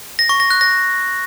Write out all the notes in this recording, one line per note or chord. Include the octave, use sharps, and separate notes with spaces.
A#6
C#6
A#6
F#6
A#6